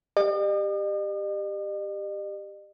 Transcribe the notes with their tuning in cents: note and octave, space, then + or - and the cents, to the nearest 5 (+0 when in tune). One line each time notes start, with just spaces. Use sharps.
G4 +15 D#5 -45